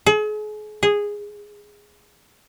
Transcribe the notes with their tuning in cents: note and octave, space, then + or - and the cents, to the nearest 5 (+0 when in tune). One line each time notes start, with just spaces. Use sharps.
G#4 +40
G#4 -10